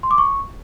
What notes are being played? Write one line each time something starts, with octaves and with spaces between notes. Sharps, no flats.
C6
D6
C#6